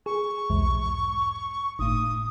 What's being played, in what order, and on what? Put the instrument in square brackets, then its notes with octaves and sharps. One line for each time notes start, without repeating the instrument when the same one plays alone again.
[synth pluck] G#4 [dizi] C#6
[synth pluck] B1 E2 G#2
[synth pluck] G1 A2 [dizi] D#6